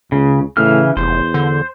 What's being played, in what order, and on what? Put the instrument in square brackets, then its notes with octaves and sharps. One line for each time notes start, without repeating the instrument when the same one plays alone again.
[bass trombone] C#2 [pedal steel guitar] C#3
[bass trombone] A2 [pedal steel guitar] C#3 E3 F6
[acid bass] F1 [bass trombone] E2 [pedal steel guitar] C5
[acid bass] D3